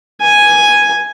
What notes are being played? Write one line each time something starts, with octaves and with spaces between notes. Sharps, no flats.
G#5